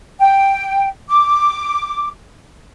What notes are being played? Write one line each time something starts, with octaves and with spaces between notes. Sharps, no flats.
G5
D6